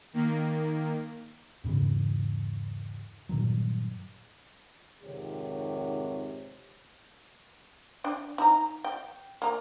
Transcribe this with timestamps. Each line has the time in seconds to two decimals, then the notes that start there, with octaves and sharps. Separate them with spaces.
0.13 D#3 A#3
1.64 E2 G#2 C#3 E3
3.29 G2 A#2 D#3 F#3
5.02 F2 G#2 C3 D#3 G4 C#5
8.04 D4 G5
8.38 D#4 A#5
8.84 G5
9.42 A#3 A#5